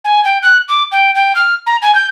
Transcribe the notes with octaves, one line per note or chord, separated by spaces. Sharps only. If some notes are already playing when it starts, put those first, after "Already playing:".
G#5
G5
F#6
D6
G5
G5
F6
A#5
G#5
G6